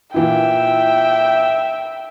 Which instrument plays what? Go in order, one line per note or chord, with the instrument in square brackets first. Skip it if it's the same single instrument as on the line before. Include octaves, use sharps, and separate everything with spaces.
[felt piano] A#2 E3 E4 [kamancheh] E5 G5